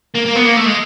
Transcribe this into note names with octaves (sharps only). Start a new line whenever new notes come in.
A#3
A#3
B3
A#3
A3
G#3